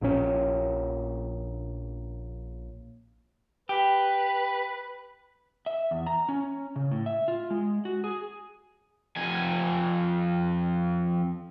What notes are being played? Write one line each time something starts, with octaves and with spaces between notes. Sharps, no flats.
A#1 A#2 E3 C#4
G4 B4
E5
E2
A#5
C#4
C#3
A2
E5
F4
G#3
F#4
G#4
F2 G#5